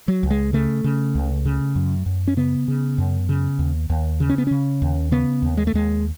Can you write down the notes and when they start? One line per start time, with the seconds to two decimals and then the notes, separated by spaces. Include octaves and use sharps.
0.08 F#3
0.23 C#2
0.31 G#3
0.53 C#3 A3
0.84 C#3
1.15 C#2
1.45 C#3
1.76 F#2
2.06 F#2
2.28 C#4
2.37 C#3 B3
2.68 C#3
2.98 F#2
3.29 C#3
3.59 D#2
3.90 D#2
4.20 C#3
4.30 C#4
4.38 B3
4.47 C#3 C#4
4.82 D#2
5.12 C#3 B3
5.42 D#2
5.57 G#3
5.67 A3
5.74 D#2 G#3